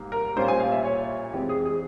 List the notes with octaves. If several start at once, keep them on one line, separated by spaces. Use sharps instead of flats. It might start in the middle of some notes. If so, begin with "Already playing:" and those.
Already playing: G#2 G3 A#3
A#4
A#2 G3 C#4 F4 C5
G#5
F5
E5
C#5
F2 E3 G#3 C4 G4
G#4
G#4